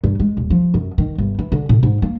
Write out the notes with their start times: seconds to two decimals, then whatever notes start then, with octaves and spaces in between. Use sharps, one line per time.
0.04 G2
0.20 G#3
0.37 D#1
0.50 F3
0.74 F#2
0.98 D#3
1.18 G1
1.39 E3
1.52 D3
1.69 A2
1.83 G#2
2.02 A#3